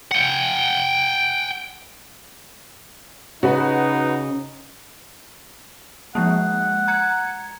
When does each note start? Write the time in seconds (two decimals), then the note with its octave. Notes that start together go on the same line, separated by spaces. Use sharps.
0.12 F#5 G5
3.43 C#3 D#4 F#4 B4
6.15 F3 G#3 A#3 F#5
6.88 A#5 G#6 C#7